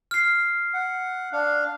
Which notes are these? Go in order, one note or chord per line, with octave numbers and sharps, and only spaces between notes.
F6 C7
F#5
D4 F5